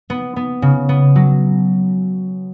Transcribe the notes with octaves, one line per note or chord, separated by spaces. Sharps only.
B3
B3
C#3
B3
F#3